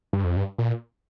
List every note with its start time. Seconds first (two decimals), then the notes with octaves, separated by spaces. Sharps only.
0.13 G2
0.24 F2
0.37 G2
0.58 A#2